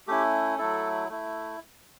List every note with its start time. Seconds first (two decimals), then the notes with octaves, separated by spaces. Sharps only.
0.07 A3 C#4 E4 G4
0.58 F#3 A3 E4 A4
1.09 A3 E4